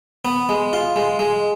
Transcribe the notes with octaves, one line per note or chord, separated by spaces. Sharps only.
B3
G#3
F4
G#3
G#3